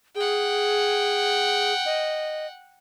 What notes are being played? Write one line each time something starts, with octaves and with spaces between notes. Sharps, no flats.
G#4 F#5 G5
D#5